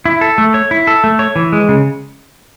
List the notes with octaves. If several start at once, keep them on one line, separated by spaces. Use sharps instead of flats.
E4
A4
A3
C#5
E4
A4
A3
C#5
E3
G#3
C#3